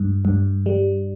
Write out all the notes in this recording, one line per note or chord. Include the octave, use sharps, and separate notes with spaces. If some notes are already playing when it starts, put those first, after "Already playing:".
Already playing: G2
G2
G3